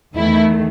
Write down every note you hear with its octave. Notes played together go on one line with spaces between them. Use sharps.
E2 D#3 A3 E4